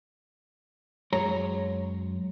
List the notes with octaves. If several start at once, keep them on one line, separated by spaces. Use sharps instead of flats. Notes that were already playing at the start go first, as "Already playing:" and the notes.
F#2 G#3 C#5 A#5